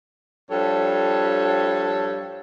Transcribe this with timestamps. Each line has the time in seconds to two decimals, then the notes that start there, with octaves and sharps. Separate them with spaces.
0.50 G2 F3 A4 C#5